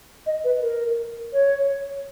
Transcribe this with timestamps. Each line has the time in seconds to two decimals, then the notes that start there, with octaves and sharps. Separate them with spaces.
0.26 D#5
0.44 B4
0.62 A#4
1.33 C#5